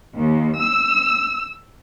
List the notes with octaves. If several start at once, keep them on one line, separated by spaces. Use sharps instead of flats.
D#2
E6